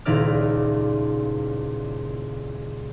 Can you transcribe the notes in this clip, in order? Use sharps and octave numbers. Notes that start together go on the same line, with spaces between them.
D#1 C#2 D#4 E4 D5 F6